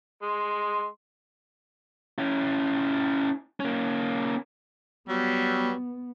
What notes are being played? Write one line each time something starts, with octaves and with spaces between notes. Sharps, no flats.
G#3 C6
C#4 E4
A#3 C#4
F#3 G3 B3